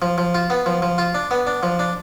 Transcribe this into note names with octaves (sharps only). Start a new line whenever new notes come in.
F3
F3
F4
B3
F3
F3
F4
D4
B3
D4
F3
D4